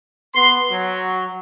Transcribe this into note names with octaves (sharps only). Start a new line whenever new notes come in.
B3 C6
F#3